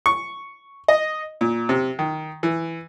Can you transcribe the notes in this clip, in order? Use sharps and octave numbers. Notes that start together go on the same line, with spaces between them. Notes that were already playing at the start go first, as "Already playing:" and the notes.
C#6
D#5
A#2
C3
D#3
E3